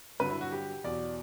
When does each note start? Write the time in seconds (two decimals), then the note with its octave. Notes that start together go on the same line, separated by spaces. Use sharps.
0.20 G2 D3 F#3 B4
0.30 E4
0.41 F#4
0.52 G4
0.84 E2 B2 F#3 D5